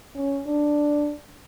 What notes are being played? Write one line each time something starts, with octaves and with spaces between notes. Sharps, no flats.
C#4
D4